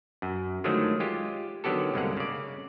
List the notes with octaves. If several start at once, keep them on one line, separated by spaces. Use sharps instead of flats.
F#2
D3 D#3 F3 F#3 G#3 A3
G#3 F4 G4
D3 D#3 F#3 B3 G4 A4
C2 G2 D3 G#3 A#3 F#5
C#3 D5